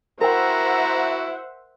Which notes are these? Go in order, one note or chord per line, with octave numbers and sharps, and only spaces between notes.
E4 F#4 A#4 C5 E5 F#5 G5 A#5